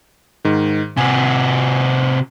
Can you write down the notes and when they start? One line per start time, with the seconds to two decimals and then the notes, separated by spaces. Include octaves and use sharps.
0.45 G#2 D#3
0.97 C3 F#4 G#5